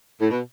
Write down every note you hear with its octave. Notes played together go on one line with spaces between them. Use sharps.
A2
B2